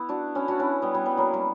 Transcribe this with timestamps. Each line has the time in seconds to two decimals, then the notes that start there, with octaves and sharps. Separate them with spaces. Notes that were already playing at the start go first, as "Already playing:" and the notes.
Already playing: B3 E4
0.09 D4 F#4
0.35 C#4 E4
0.48 D4 F#4
0.59 C#4 E4
0.82 G3 B3
0.95 G3 B3
1.06 G3 B3
1.17 F#3 A#3
1.33 G3 B3